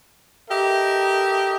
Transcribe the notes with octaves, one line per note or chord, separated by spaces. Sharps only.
G4 A4 A#4 D#5 E5 G5